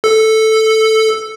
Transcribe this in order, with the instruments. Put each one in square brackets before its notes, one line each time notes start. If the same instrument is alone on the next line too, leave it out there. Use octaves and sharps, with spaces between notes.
[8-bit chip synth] A4